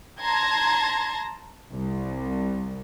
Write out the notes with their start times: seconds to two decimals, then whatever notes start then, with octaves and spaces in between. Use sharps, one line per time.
0.22 A5 A#5 C6 G#6 A#6
1.72 C2